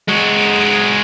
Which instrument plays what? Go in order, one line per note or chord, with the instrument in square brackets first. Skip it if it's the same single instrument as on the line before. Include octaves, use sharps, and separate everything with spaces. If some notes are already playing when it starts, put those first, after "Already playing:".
[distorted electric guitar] G#3 F#4